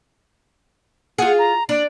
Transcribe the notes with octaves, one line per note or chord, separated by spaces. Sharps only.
F4 G#4 F#5
A#5
D4 D5